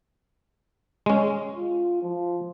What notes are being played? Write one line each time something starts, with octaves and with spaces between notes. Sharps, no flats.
G#3 C#4
F4
F3